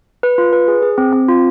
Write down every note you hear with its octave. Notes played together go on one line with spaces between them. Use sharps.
B4
F4
B4
G#4
G#4
C4
C4
F4